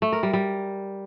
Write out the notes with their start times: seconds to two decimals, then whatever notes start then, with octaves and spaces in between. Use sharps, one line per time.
0.02 A3
0.12 A#4
0.23 G3
0.33 G3